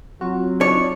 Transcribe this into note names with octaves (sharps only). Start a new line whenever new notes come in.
F#3 C4 F4 F#4
D4 D#4 C#5 D5